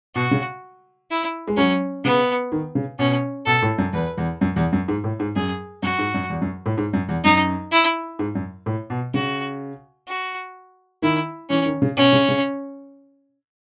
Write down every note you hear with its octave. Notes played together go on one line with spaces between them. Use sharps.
B2 F#4
C#3
E4
G#3
F#3 C#4
C#3 B3
D#3
C#3
B2 C#4
B2 A4
A2
F#2
E2 B4
E2
F#2
E2
F#2
G#2
A2
G#2
F#2 G#4
F#2 F#4
G#2
F#2
E2
F#2
A2
G#2
F#2
E2
F#2 D#4
E4
G#2
F#2
A2
B2
C#3 F#4
F#4
D#3 E4
E3 C#4
D#3
C#3
B2 C#4
C#3
C#3